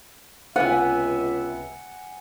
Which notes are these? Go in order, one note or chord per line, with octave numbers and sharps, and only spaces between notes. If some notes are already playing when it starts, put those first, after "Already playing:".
C#2 C3 B3 E5 F#5 G#5